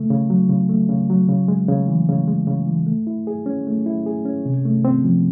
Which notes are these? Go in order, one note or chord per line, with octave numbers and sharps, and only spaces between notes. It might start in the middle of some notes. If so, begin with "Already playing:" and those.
Already playing: C#3 A3
C#3
F#3
C#3
A3
C#3
F#3
C#3
G#3
C#3
E3
C#3
G#3
C#3
E3
A3
E4
G#4
C#4
A3
E4
G#4
C#4
C3
A3
C4
F3